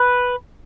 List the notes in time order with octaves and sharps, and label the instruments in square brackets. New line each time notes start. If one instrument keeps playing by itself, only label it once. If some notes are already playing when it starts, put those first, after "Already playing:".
Already playing: [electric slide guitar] B4